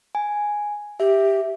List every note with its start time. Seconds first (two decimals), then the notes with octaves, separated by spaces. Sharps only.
0.15 G#5
1.00 G4 E5